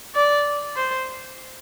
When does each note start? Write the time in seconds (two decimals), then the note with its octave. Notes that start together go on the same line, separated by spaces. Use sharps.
0.15 D5
0.76 C5